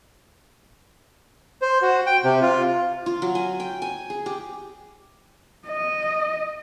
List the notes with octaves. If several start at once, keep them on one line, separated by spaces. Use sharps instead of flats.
C5
F#4
G5
C3
F4
F4
F#3
G#5
G5
G#5
G#4
G4
D#5